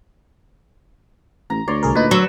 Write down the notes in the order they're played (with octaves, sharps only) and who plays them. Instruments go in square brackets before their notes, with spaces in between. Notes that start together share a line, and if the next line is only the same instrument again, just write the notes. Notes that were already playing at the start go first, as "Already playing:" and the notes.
[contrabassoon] A1 [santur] A#5
[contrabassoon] D2 [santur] C#5 D5 C6
[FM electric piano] C2 G#4 A#4
[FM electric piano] A#2 D#4 [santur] B4
[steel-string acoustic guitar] F#3 [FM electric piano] C#6 E6